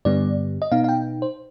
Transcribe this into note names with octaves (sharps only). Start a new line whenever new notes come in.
G2 D3 G3 B3 D5
D#5
B2 B3 D#4 F5
F5
G5
C5